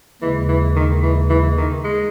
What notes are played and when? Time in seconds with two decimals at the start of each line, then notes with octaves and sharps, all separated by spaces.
0.21 D#2 C#3 E3 G#3
0.48 E3
0.76 D#3
1.03 E3
1.30 E3
1.57 D#3
1.84 G#3